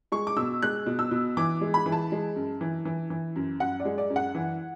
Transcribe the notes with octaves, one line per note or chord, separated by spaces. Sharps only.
G#3 C#6
D6
B2 E6
G#3 F#6
B2
E6
B2
E3 D6
G#3
B5
E3
A5
G#3
F#2
E3
E3
E3
F#2
F#2 F#5
D5
G#3
D5
F#2
F#5
E3